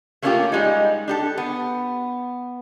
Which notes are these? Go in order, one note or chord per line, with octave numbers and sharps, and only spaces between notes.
A3 A#3 C#4 E4 F4 G4
G3 G#3 D#4
D4 G4 A4
B3